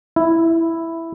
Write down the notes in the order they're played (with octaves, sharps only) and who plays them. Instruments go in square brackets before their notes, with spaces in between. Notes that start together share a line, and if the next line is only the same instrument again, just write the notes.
[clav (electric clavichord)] E4